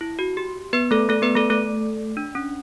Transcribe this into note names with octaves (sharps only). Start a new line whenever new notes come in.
E4
F#4
G4
B3 B4
A3 A4
A3 A4
B3 B4
A3 A4
A3 A4
D4
C#4